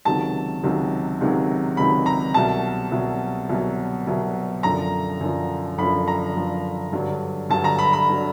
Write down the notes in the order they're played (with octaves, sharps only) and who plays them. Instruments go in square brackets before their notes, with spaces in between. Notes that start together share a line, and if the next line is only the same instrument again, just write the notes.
[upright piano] C#2 C3 D#3 F#3 A5
C#2 C3 D#3 F#3
C#2 C3 D#3 F#3
C#2 C3 D#3 F#3 B5
A#5
C2 B2 F#3 A5
C2 B2 F#3
C2 B2 F#3
C2 B2 F#3
F#2 D3 F3 A#5
F#2 D3 F3
F#2 D3 F3 B5
A#5
F#2 D3 F3
G2 D3 F#3
G2 D3 F#3 A5
A#5
B5
B5
D3 F#3